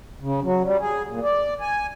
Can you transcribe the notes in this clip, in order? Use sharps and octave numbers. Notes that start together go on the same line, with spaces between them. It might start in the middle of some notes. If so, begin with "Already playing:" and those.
C#3
F#3
G3
G#4
A#2
D5
G#5